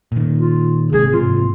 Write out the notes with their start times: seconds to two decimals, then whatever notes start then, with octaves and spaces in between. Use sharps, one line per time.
0.12 A#2 D#3
0.38 F4
0.92 G#1 C3 G#3 G#4
1.13 G#2 C3 E3 F4